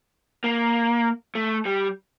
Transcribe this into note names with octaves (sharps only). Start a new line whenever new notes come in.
A#3
A3
G3